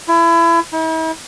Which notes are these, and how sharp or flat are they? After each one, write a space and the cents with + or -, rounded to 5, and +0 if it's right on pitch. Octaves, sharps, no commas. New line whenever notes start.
E4 +30
E4 -45